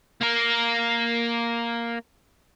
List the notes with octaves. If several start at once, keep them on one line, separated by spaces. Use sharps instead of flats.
A#3 A#4